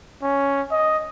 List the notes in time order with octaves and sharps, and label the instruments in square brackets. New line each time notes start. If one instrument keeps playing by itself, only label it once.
[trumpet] C#4
D#5